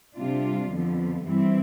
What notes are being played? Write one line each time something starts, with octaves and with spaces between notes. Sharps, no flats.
C3 G3 D4 F4
F2 D3 F3 B3
G2 E3 G3 C4 E4